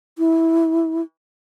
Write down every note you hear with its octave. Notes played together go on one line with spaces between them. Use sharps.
E4